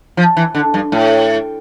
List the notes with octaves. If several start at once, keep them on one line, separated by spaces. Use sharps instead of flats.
F3
E3
D3
G2
A2